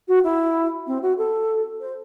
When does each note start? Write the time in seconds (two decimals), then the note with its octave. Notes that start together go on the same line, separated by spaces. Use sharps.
0.08 F#4
0.24 E4
0.87 C4
1.02 F#4
1.18 A4
1.81 C5